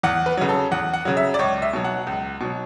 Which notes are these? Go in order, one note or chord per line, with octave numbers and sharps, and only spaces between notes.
E2 F#5
B4
C#3 F#3
A4
E2 F#5
F#5
C#3 F#3
E5
D5
C#2 C#5
E5
B2 F#3
F#5
C#2
B2 F#3